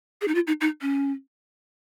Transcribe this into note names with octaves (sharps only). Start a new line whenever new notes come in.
G#4
D#4
F4
D#4
D#4
C#4